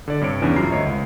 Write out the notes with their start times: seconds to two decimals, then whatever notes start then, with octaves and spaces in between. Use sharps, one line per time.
0.08 D3 D5
0.21 G2 C3 C#5 D7
0.42 E2 C#3 E3 C#4 D4
0.56 E2 G2 F#3 F4 A#5 C7
0.70 D2 C#5 D#5 E5
0.85 C#2